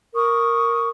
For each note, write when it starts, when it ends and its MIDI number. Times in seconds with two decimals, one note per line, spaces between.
0.14 0.88 70
0.14 0.88 85
0.14 0.88 87